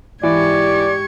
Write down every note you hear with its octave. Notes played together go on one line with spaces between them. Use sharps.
G#2 E3 G4 D5 C#6 G#6